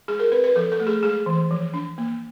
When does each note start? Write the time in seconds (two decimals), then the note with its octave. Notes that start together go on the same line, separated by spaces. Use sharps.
0.08 G#3 G#4
0.20 A#4
0.31 C4 B4
0.44 B4
0.56 F3 A4
0.72 A4
0.80 A3
0.87 G#4
1.03 G#3 G#4
1.26 E3
1.51 F3
1.74 D4
1.98 A#3